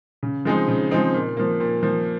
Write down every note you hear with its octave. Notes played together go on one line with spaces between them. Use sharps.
C#3
F3 G#3 C4 D#4
C#3
F3 G#3 C4 D#4
A#2
F3 A#3
A#2
F3 A#3